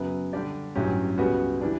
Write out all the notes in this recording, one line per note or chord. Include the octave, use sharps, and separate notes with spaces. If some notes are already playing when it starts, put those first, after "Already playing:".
Already playing: F#2 C#3 F#3 B3
D3 G3 D4 G4 D5
A1 G2 F#3 C#4 G4
C#2 C#3 G3 B3 F#4
E3 G3 D4